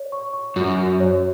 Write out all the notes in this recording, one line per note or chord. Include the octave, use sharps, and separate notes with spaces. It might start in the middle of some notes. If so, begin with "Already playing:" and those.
Already playing: C#5
C#6
C#6
F#2 F#4
F#4
C#5